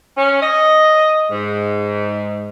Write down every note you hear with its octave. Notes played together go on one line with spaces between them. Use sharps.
C#4
D#5
G#2